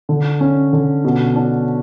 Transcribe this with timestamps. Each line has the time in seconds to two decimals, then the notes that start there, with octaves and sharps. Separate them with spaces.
0.09 D3
0.40 C#4
0.73 D3
1.05 B2
1.36 D4